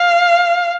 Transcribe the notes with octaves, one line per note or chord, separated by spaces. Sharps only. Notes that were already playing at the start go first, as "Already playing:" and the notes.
Already playing: F5